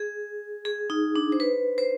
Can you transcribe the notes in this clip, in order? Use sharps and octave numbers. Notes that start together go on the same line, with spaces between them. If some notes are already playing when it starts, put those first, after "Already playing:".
Already playing: G#4
G#4
D#4
D4
C5
B4
C5